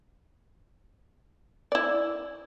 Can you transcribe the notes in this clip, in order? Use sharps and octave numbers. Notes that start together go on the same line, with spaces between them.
E4 D5